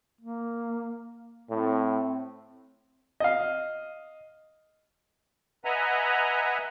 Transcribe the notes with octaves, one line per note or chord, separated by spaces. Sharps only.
A#3
A2 C4
D#5 F5
B4 D#5 E5 F#5 G#5 A#5